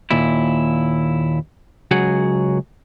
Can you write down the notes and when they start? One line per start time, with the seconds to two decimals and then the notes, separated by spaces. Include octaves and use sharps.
0.11 D#2 A#2 E4
1.91 C#2 F#3 F#4 G#4 F#5